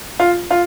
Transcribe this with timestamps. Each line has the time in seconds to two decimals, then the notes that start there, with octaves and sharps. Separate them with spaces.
0.19 F4
0.50 F4